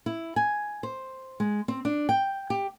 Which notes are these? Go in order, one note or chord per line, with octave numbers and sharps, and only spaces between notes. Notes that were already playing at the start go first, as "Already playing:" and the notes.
E4
G#5
C5
G#3
C4
D4
G5
G4